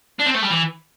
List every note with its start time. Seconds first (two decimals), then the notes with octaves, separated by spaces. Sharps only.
0.19 D4
0.26 C4
0.34 A3
0.42 G3
0.50 E3